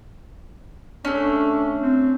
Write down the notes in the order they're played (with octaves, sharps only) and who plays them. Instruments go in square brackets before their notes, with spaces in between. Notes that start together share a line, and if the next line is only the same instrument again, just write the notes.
[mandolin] A3 C#4 [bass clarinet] D4
[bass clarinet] C4